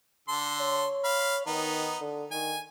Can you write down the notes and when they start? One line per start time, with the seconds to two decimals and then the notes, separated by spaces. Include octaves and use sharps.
0.28 D3 A4 C6
0.61 C#5
1.04 F5 B5
1.47 D#3 B3 D#4
2.00 D3
2.31 D#3 G#5